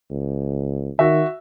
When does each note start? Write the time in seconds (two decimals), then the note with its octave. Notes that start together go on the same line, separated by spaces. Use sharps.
0.10 C#2
0.99 D#3 F#4 E5